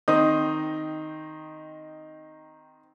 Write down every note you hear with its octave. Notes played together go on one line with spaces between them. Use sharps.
D#3 C4 D#4 D#6